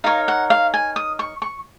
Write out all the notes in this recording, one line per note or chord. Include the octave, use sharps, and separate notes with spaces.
D#4 A#4 C#5 F5
F#5
F5
G#5
D#6
C#6
C#6